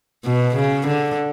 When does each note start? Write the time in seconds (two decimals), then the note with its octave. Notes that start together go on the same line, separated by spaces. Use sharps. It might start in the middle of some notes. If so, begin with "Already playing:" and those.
0.25 B2
0.56 C#3
0.87 D3